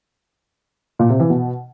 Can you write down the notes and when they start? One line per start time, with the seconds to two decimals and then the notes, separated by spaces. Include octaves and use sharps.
0.99 A#2
1.10 C3
1.20 E3
1.30 B2